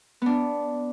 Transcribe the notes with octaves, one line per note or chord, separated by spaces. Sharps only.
B3 D4